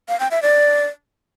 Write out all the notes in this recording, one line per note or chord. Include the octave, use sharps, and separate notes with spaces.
F5
G5
E5
D5